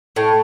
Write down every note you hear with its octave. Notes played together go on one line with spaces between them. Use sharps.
A2